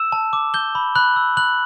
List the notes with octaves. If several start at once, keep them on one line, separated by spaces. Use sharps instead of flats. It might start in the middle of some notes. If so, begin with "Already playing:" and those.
Already playing: E6 E7
A5
D6
G6 G7
B5
B5 F#6 F#7
E6
B5 F#6 F#7